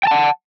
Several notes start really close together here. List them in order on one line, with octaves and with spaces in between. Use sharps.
G5 A5 F#5